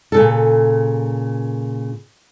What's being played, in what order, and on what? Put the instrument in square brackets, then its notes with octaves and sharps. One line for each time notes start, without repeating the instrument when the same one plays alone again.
[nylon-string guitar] A#2 C#3 A4